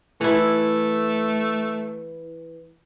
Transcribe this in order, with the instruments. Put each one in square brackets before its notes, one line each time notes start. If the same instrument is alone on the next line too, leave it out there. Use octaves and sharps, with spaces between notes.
[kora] E3 E4 [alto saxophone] A3